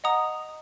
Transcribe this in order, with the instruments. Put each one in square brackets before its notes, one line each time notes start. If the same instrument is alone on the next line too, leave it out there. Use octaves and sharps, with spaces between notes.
[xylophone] D#5 F#5 A#5 D#6